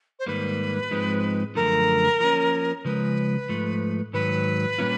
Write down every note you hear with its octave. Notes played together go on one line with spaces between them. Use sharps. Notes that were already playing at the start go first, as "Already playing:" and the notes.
C5
G#2 D#3 G3 A#3 B4
G#2 F3 G#3 C4 D#4
F#2 D3 F3 A3 A#4
F3 A#3 C#4
C#3 F3 G#3 B4
G#2 F3 A3
G#2 D#3 F#3 B4
A#2 G3 A#3 C#4 F4